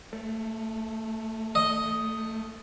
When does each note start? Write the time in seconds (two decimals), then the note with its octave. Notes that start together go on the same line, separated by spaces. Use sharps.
0.13 A3
1.55 D#5